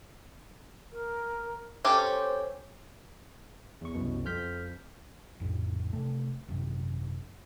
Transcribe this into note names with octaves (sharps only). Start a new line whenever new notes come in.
A#4
C#4 G4 A4 C5
E2 C#6
C2 F#2 B2
F2 F3 F6 G6 B6
A#1 F2 A2 C#3
C3 A3
G#1 F#2 C3